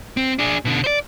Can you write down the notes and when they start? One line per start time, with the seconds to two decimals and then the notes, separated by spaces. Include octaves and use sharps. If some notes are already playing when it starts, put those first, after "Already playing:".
0.17 C4
0.39 D4 G#4
0.65 B2 D3
0.84 C5 D5